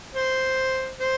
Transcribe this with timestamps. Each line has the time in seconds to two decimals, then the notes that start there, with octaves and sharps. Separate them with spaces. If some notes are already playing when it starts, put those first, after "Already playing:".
0.14 C5
1.00 C5